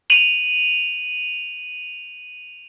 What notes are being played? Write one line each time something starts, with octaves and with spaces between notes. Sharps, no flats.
D#7 F7 F#7